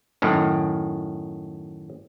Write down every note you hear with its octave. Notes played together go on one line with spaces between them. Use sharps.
F#2 A2 D#3